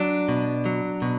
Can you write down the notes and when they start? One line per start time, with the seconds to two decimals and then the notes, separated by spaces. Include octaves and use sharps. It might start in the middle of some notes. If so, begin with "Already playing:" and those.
Already playing: F#3 D4
0.29 B2
0.66 F#3
1.02 B2